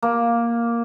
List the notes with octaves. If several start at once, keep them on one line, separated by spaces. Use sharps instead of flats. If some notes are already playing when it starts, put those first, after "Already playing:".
A#3